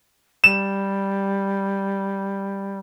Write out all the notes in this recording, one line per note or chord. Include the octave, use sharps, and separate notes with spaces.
G3 E7